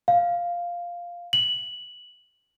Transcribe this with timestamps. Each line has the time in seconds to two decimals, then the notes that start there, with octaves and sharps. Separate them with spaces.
0.08 F5
1.33 F#7